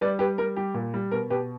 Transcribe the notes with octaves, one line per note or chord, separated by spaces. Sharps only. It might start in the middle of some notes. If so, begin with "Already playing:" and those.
G3 B4 D5
G3 G4 B4
G3 A#4
G3 G4
A#2
G3
B2 A#4
B2 G4 B4